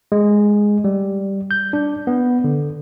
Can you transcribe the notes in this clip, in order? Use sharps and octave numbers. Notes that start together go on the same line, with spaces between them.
G#3
G3
G6
D4
B3
D3